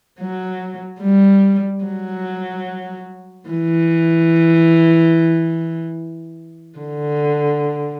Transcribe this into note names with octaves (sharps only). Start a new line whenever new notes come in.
F#3
G3
F#3
E3
D3